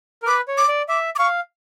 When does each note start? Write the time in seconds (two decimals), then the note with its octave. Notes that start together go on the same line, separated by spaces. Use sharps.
0.22 A#4
0.27 B4 D6
0.48 C#5
0.58 D6
0.68 D5
0.88 E5 D6
1.16 D6
1.18 F5 C#6